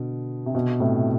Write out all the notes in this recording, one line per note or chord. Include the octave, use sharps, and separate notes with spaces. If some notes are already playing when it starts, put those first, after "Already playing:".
Already playing: B2 D3
C3
B2
A2 C3